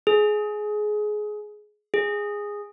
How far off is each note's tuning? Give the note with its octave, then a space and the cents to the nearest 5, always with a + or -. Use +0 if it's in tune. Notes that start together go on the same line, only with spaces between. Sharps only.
G#4 +20
G#4 -10